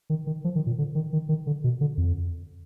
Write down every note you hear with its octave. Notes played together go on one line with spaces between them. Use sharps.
D#3
D#3
F3
D#3
A#2
D3
D#3
D#3
D#3
D3
B2
D3
F2